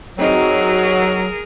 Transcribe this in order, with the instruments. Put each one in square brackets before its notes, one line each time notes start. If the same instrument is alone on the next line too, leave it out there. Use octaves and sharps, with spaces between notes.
[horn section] F#3 [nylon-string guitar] C4 D#4 [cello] G#4 A#4